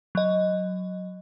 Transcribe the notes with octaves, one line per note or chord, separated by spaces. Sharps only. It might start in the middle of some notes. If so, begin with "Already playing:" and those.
F#3 D#5